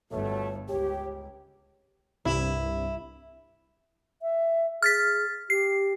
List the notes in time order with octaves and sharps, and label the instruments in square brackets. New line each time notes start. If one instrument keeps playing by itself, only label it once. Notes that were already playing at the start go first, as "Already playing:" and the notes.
[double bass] G1 [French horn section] B2 A3 [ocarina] C#5
[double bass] C#2 [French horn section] G4 [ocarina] C#5
[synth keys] C2 G2 [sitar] E4
[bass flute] E5
[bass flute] G#4 [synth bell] F6 A6 B6
[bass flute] G4 [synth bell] C7